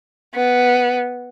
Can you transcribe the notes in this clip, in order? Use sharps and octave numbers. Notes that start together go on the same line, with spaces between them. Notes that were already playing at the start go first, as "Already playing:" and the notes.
B3